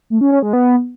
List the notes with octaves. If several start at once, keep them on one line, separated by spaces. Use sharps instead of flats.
A3
C#4
C#4
G#3
B3